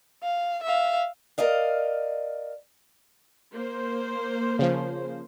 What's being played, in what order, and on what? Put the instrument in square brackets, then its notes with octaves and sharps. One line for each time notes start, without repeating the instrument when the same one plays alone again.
[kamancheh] F5
E5 F5
[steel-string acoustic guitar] A#4 D5 D#5 F5
[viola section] A#3 C5
[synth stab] C#3 F3